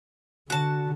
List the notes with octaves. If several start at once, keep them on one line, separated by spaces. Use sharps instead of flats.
D3 F#4 A5